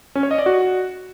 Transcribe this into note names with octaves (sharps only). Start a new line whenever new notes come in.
C#4
C#5
D#5
D5
F#4